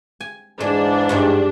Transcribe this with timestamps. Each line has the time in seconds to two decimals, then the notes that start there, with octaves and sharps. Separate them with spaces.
0.21 G#5
0.60 G#2 E3 G#3 D4
1.09 G2 G3 G#3